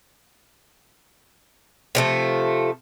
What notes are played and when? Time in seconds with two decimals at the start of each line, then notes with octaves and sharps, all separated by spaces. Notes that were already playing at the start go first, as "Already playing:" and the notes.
1.95 C3 F3 A3